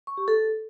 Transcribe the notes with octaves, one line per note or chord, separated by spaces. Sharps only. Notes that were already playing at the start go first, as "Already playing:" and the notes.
C#6
G4
A4